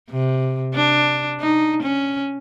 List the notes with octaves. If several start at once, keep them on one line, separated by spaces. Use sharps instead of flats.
C3
D4
D#4
C#4